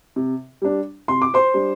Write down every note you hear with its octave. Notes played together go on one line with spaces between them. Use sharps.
C3
G3 D4
C3 C6
D6
C5 C6
G3 D4